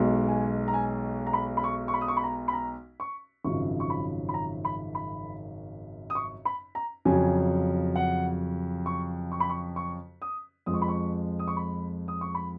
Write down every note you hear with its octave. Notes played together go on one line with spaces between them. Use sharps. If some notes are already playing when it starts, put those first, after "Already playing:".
Already playing: B1 B2 G#3
G#5
A#5
G#5
A#5
B5
B5
C#6
C#6
B5
D#6
C#6
B5
A#5
B5
A#5
C#6
G#1 F#2 C#3 F3 C#6
C#6
B5
B5
A#5
B5
B5
D#6
C#6
B5
A#5
F2 C#3 F#3 G#5
F#5
C#6
C#6
B5
C#6
C#6
D#6
F2 F3 G#3 D#6
C#6
B5
C#6
D#6
C#6
B5
D#6
C#6
B5